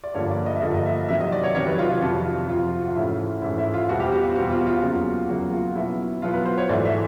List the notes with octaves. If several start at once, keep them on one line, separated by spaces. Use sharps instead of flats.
D5
G2 D3 F3 A#3 C#5
D5
D#5
E5
G2 D3 F3 A#3 D#5
D#5
E5
C3 D#3 F#3 E5
D#5
D5
C#5
C3 D#3 F#3 C#5
B4
F4
F4
F2 C3 F3 F#4
F4
F2 C3 F3 F4
F#4
F4
G#2 E3 A3 C#4 E4
G#2 E3 A3 C#4 E4
E4
F4
E2 B2 G3 C4 F#4
G4
F#4
F4
E2 B2 G3 C4 F#4
F4
F4
E2 C#3 F#3 A#3 F#4
F4
E2 C#3 F#3 A#3 F#4
F4
B2 F#3 B3 E4
B2 F#3 B3 F4
B4
C5
C#5
G#2 E3 A3 D5
E5